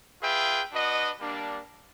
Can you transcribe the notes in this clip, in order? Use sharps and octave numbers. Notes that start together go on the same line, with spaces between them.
F4 G#4 B4 E5 G5
D4 F#4 B4 D#5 F#5
G3 A#3 D4